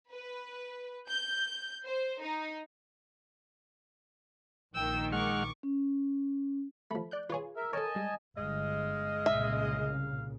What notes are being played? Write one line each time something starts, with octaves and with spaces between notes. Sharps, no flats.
B4
G6
C5
D#4
A#1 D#3 G5 E6
G#3 F#5 C#6 D6 F6
C#4
F3 A3 B5
D5 F#6 G6
F4 G#4 B4 C#5
A#4 E5
A4 A#4 C#5 D#5 G#5 A5
G3 G#3
G1 G#3 D#5 F5
C2 A#2 C#3 E5